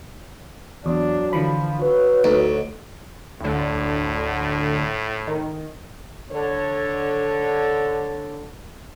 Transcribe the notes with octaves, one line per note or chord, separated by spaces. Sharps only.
E2 F#3 D4
D3 E3 F3 B5
F#3 B4
D2 D#4
D2 A2 D3
D#3
D3 A4 C#5